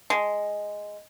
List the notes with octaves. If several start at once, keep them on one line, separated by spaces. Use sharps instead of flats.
G#3